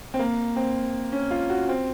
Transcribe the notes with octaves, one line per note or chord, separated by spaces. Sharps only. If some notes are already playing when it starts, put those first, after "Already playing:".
C4
A#3
C4
C#4
F4
F#4
C4